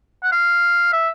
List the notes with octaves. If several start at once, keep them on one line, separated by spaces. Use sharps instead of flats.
F#5
F5
E5